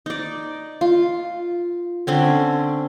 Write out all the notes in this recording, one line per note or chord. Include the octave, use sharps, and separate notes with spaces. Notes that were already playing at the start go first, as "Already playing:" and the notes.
D#4 D5
F4
D3 C4 C#4